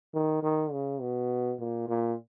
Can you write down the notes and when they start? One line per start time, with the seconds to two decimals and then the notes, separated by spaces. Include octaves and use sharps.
0.14 D#3
0.43 D#3
0.72 C#3
1.01 B2
1.60 A#2
1.88 A#2